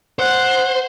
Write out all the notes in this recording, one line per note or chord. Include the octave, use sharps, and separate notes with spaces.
C5 F#5